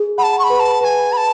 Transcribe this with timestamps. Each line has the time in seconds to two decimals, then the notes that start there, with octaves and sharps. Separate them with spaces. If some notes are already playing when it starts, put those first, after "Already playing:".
Already playing: G#4
0.18 F#5 B5
0.23 A5
0.39 C#6
0.44 B5
0.50 B4
0.60 A5
0.81 B4 A5
0.84 G#5
1.12 B4 B5
1.17 A5